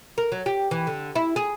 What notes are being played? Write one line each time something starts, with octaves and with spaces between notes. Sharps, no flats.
A#4
F#3
G4
E3
D3
E4
G#4